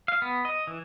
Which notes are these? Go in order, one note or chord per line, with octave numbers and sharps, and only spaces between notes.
F5
B3
D#5
E3